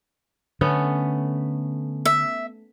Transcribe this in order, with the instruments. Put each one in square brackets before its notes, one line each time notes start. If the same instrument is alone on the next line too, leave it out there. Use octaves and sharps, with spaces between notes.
[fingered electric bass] D3 [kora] A3 B3 C#4
[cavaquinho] E5